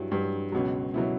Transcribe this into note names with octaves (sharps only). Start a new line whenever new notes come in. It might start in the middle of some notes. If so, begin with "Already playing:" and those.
Already playing: G2 F#3 E4
G2 F#3
C#2 B2 F#3
B2 F#3 E4